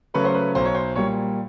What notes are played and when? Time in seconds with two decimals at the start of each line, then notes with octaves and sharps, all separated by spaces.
0.14 C#3 F#3 A3 C#4 B4
0.25 C5
0.34 B4
0.55 B1 C5
0.65 C#5
0.75 C5
0.95 A#2 G3 C#5